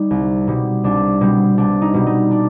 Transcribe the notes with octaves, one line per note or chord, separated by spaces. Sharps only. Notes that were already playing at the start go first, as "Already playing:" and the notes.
Already playing: G3 D#4
C2
B2 G3
C2 D4
B2 G3 C4
C2 D4
D#4
B2 G3
D#4
D4